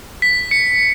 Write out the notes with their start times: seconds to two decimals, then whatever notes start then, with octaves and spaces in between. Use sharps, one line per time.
0.22 B6
0.51 C#7